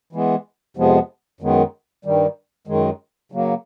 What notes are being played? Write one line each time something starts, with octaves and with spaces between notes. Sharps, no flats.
E3 G#3 B3
F2 C3 F3 G#3 B3
F#2 D#3 G#3 B3
G2 D#3 G3
F#2 D#3 G#3
C#3 F#3 A#3